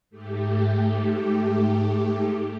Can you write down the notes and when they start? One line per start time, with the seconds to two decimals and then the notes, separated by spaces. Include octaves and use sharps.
0.10 G#2 A3 G4